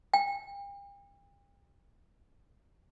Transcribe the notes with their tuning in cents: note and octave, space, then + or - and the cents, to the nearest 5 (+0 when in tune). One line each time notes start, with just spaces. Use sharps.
G5 +40